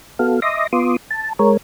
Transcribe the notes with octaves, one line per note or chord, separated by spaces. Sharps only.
B3 F#4 A4 F5
D#5 E5 C6 D6 D#6 A#6
B3 F4 C6 D6 D#6
A5
G#3 A#4 C#5